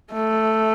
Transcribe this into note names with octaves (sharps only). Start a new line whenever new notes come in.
A3